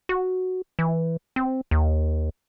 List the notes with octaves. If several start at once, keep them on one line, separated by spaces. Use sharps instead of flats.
F#4
E3
C4
D#2